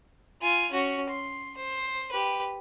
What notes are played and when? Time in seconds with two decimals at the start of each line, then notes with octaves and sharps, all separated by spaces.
0.41 F4 G#5
0.71 C#4 F#4
1.09 C6
1.57 C5
2.11 G4 B4